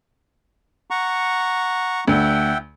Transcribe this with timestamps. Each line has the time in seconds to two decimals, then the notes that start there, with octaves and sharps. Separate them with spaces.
0.90 F#5 A#5 C#6
2.07 D2 E5 F#5 G5